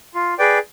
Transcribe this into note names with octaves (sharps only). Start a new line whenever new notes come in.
F4
G#4 B4 D5 G5